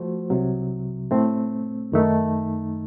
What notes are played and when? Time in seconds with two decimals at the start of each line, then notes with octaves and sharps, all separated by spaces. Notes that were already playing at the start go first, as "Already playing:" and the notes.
Already playing: F3 A3 F#4 C5
0.30 C2 C3 F#3
1.11 A2 A3 C4
1.92 F#2 D#3 A3 D#4